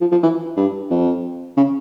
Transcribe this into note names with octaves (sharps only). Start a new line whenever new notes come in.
F3
F3
E3
G2
F2
C#3